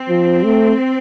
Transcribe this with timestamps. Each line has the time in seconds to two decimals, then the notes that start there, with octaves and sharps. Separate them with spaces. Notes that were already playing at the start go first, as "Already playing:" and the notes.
Already playing: C4
0.10 F3
0.45 A3